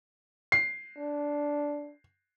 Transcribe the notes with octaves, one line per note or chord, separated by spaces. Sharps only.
C7
D4